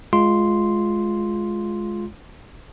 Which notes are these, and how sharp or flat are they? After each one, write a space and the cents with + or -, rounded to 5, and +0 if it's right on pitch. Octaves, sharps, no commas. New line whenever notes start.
G#3 +15 F4 +0 C6 +0